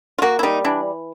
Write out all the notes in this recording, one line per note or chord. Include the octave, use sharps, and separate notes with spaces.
F4
A#3 F#4
E4
G3 D#4
E3 D4